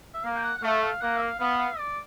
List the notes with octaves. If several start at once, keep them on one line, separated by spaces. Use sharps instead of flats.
E5
A#3 F5
G5
F#5
F#5
A3 F5
E5
F5
A#3 F#5
E5
F5
B3 F5
F5
D5